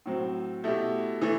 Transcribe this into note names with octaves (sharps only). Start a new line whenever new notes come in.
A2 F#3 C4
B2 A3 E4 G4
E3 A3